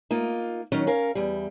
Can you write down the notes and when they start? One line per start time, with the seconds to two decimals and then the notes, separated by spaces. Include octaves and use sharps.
0.11 A#3 D#4 F4
0.72 D#3 F#3 C#4
0.87 C#4 A#4 F5
1.15 E2 G3